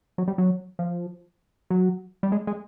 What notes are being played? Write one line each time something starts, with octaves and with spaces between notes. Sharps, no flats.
F#3
G3
F#3
F3
F#3
G3
G#3
G#3